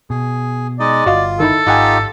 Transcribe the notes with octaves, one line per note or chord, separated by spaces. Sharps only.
B2 G#4
G#3 D#4 D5 D#5
G1 F4 F#4 D#5 F5
D#3 D#4 E4 A4
G#1 D#4 F4 G4 D#5 F#5 G#5